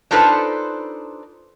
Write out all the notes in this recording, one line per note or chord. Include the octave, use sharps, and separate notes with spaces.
D4 D#4 F4 A4 B4 C5